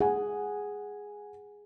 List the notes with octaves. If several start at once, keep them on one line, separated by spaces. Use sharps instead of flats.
G#4 F#5 G#5